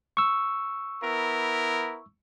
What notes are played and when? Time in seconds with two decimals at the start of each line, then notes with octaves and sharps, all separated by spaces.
0.17 C#6 E6
1.03 B3 E4 A#4